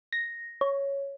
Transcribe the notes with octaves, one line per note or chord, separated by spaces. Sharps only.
A#6
C#5